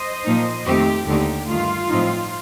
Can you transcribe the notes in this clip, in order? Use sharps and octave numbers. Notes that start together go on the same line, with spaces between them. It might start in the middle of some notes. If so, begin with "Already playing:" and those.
Already playing: C5 D#5
A#2 F3 A#3 D#4
F2 D#3 A3 C4 D#4 G4
D#2 D3 A3 D#4 G4
G2 D#3 A3 F4
A2 F3 C4 D#4